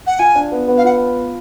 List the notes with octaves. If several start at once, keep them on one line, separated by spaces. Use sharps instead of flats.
F#5
F4 G#5
D4
B3
B3
F5
F4 F#5